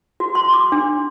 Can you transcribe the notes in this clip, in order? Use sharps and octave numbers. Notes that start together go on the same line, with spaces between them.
F#4
C6
D6
D4